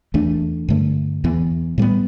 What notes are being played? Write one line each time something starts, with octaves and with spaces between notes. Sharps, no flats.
E2 E3 A3 D4
G2 D3 A3
E2 E3 B3
A2 G3 B3